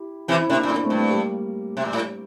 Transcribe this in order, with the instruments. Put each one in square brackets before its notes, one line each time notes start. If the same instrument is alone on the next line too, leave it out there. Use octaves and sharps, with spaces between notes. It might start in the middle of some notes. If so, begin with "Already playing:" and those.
Already playing: [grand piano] E4 G4
[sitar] C3 E3 [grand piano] C4 E4
[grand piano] E4
[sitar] C3 [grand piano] A#3 D4
[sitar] A#2 [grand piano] E4
[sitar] A2 [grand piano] A#3 D4
[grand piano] A3 C4
[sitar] G2
[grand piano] A3 C4
G3 A#3
[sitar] C3
A#2
A2